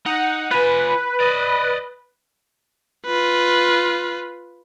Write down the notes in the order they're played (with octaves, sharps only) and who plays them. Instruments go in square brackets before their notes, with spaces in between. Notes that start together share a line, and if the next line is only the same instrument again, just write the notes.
[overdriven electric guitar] D#4 [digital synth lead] F#5
[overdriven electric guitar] F4 G#5 [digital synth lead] B4
[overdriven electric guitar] D5 D#5
[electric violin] F4 B4